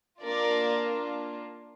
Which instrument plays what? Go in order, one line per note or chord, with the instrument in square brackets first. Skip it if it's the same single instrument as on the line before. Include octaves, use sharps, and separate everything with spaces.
[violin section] A#3 D4 F4 A#4 D5